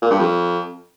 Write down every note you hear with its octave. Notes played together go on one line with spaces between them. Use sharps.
A#2
G2
F2